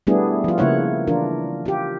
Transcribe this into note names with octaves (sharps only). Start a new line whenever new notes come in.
G3 A3 B3 D4 E4 G#4
F3 F4
C#3 A#3 E4 C#5 F#5
E3 D4 F4 A#4
F4 G4